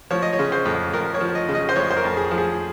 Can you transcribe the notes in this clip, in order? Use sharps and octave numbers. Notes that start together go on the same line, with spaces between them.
F3 C#5
D#5
C#5
C#3
C5
F2
F2 A#4
C#5
F3
D#5
C#3
D#5
C5
F2 C#5
C5
A#4
F2
G#4
F3
G#4